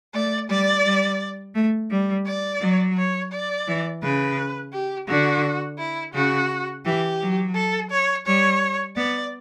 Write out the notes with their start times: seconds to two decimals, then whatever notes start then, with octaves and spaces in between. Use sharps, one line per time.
0.14 A3 D5
0.49 G3 D5
0.85 G3
1.55 A3
1.91 G3
2.26 D5
2.61 F#3
2.97 C#5
3.32 D5
3.68 E3
4.03 C#3 B4
4.73 G4
5.08 D3 F#4
5.79 E4
6.14 C#3 F#4
6.85 E3 G4
7.20 F#3
7.55 A4
7.91 C#5
8.26 G3 C#5
8.96 B3 D5